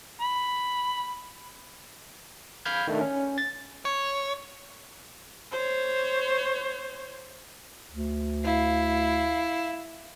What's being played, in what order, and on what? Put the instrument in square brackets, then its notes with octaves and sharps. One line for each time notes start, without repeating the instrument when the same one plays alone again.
[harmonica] B5
[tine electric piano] F5 B5 F6 G6 G#6
D#3 A3 D4
C#4
A6
[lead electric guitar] C#5
[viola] C5 C#5
[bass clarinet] D2
[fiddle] E4 [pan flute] F5